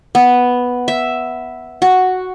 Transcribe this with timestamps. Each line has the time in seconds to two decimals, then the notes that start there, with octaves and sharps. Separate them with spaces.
0.15 B3
0.88 E5
1.82 F#4